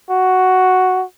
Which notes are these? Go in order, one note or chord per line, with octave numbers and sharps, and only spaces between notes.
F#4